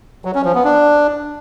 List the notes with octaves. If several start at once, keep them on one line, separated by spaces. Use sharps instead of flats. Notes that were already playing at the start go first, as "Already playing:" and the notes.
F#3
C#4
F3
B3
D4